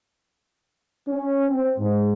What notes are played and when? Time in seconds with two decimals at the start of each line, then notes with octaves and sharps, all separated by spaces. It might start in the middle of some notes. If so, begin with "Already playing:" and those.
1.08 C#4
1.48 C4
1.79 G#2